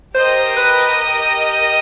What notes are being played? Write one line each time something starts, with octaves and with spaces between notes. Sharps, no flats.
G4 A#4 C5 D#5 G5
B4